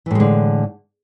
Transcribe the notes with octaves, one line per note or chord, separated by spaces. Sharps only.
A2 D3 E3 G#3